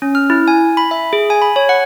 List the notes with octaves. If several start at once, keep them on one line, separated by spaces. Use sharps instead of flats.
C#4
F6
E4
G#5
B5
E5
G#4
G#5
B5
C#5
F#5